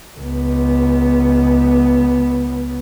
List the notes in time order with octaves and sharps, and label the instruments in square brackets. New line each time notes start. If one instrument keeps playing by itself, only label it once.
[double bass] C#2 B3